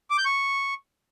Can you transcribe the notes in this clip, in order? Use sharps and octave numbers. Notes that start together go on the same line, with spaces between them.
D6
G6
C#6